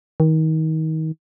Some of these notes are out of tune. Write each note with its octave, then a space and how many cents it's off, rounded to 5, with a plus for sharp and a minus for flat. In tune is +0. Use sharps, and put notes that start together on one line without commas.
D#3 +30